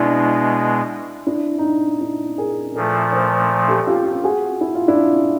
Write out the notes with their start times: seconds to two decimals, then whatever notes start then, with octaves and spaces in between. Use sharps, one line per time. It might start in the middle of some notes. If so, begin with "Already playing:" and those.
Already playing: B2 G#3 B3 D4 E4
1.27 D4 E4
1.59 D#4
1.64 D4
2.01 D4 E4
2.38 G#4 A#4
2.75 A#2 F3 A3 A4 B4
3.12 A#4 C5
3.68 G4 A4
3.87 F4 G4
4.06 F4 G4
4.24 F#4 G#4
4.61 E4
4.75 F4
4.88 D4 E4